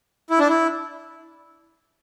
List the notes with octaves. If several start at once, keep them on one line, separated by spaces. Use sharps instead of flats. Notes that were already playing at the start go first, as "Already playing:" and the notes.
E4
D4
E4